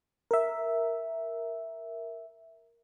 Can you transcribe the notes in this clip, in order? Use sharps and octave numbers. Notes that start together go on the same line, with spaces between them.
A#4 E5